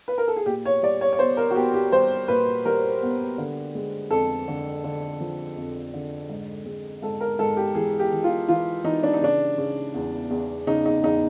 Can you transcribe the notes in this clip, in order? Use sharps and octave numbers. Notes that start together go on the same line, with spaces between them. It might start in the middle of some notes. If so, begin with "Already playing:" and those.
B4
A#4
A4
G#4
A#2 G4
C#5
G3 D5
C#5
C#5
B3 C5
A#4
F#4
B3 G4
G4
G3 C5
A#2 B4
G3 A#4
B3
D3
G#3
F2 A4
D3
D3
F3
F2
D3
G#2
G#3
G#2 A4
A#4
G#2 A4
G4
E3 G#4
G4
E3
F4
E3 F4
E3 D#4
D4
D#4
C#3 D4
C#3
E2
E2
C#3 D#4
D#4
E2 D#4